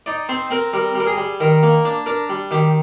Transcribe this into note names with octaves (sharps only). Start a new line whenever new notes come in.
D#4 D5
C4 C5
C4 A#4
G3 A#4
G3
A#4
G#4
G3
D#3 A#4
A#3
D4
D4 A#4
G3
D#3 G4